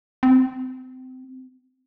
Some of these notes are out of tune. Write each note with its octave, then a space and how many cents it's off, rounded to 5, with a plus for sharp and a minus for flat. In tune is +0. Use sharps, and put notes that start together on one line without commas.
C4 -25